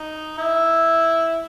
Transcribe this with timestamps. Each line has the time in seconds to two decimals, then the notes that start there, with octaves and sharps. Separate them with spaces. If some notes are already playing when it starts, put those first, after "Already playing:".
Already playing: D#4
0.38 E4